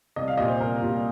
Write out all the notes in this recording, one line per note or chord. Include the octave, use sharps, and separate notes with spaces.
C2 D#5
F5
A#2 G3 D#5
C5
C2 A#4
A#2 G3